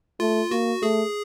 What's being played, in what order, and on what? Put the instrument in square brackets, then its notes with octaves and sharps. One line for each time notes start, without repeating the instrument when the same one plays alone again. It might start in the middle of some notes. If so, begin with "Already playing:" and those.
[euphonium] A3 [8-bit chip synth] F4
[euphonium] A#3 [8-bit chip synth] F#4
[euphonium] A3 [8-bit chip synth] G#4